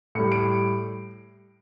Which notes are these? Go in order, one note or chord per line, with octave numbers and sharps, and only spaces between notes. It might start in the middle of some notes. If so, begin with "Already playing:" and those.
A2 G3 C#7
D7